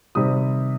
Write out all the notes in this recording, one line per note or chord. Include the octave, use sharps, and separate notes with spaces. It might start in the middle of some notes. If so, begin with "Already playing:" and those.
C3 D#3 G3 D#6